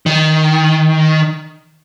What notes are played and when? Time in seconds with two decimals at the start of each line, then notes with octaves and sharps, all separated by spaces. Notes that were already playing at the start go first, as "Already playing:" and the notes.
0.06 D#3